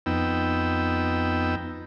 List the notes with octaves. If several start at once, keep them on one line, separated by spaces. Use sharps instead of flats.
F2 B3 D#4 G5 E6